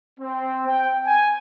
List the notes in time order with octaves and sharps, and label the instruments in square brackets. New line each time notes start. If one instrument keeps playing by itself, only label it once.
[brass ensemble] C4
G5
G#5